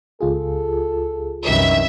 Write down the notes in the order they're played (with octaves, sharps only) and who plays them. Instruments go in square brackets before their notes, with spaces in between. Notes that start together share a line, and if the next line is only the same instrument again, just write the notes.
[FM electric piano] C#2 F4 G#4 [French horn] A4
[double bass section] C2 F#2 E3 [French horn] D#3 [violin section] E5